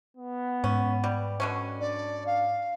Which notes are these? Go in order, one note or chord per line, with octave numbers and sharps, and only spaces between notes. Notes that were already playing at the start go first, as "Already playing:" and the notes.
B3
G#2 C#4
G3
B2 D3 C#4
D4 D5
F5